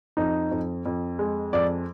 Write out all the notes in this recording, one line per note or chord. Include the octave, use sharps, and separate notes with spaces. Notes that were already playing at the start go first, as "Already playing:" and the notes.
F2 D#4
F2
F2
G#3
F2 D5